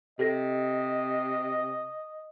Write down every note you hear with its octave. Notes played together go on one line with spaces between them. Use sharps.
C3 G4 A4 D#5 A#6